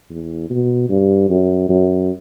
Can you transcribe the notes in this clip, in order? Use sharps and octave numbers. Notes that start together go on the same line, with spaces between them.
E2
B2
G2
F#2
F#2